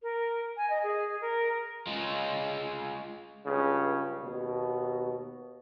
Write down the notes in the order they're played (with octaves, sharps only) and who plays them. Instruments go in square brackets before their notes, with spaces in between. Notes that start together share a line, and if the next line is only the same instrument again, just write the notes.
[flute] A#4
G#5
D#5
G#4
A#4
[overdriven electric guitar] G#3 F4
[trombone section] C#2 G2 C#3
D#2 B2